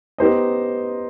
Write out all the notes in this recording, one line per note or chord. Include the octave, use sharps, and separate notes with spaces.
B3 D#4 G4 C5 D#5